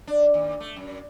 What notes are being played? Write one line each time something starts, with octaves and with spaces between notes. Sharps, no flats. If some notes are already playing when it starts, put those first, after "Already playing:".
D4
D#2
A3
F#2